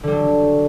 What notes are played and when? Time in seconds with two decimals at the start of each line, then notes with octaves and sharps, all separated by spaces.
0.03 D3
0.07 G3
0.12 F#3